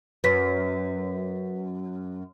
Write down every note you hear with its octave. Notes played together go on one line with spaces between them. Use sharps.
F#2 B4 B6